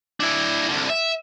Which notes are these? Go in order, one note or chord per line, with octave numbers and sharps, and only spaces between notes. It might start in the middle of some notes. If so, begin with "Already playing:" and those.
D4 E4
C2 D3
E5